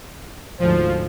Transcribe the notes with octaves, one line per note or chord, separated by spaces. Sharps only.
D2 G#2 F3 C5